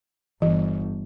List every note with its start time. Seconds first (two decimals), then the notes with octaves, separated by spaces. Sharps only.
0.42 G1 E3